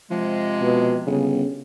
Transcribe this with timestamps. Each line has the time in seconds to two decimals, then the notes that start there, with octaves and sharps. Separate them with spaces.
0.11 C3 F3 G#3
0.61 B2
1.06 G1 C#3